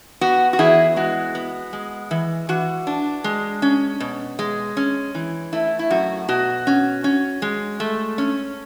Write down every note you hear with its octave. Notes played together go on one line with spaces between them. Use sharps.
B3 F#4
F#4
E2 E4 G#4
G#3 F#4
B3
G#3
E3
E3 F#4
D4
G#3
C#4
B2
G#3
C#4
E3
A3 E4
E4
F#2 F#4
B2 F#4
C#4
C#4
G#3
A3
C#4